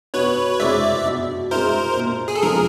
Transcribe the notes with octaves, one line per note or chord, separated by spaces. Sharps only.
B2 B4 C#5
G#3 C4 E4 D5 E5
B2
G#3 C4 E4 A#4 C5
A#2
G#4
A4
F3 G#3 C4 G#4 A#4